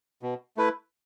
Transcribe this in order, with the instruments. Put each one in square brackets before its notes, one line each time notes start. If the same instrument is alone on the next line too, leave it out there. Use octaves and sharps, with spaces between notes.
[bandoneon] B2
A3 E4 B4